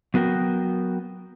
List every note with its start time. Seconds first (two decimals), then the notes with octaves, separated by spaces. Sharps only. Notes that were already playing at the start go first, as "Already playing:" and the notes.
0.14 F#3 B3 F#4 A#4 G5